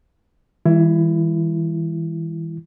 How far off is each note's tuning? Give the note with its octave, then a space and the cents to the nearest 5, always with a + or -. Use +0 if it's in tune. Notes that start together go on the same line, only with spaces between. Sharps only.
E3 -30 G3 +45 E4 +25